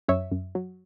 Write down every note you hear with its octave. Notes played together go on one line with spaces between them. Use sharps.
F#2 C#5 E5
F#2
F#3